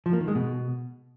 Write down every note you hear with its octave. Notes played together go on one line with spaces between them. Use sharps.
F3
A#3
D#3
G#3
B2